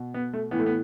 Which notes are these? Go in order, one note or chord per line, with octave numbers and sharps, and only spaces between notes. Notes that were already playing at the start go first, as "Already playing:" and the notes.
Already playing: B2
B3
A3
A2 E3 B3
A3
B3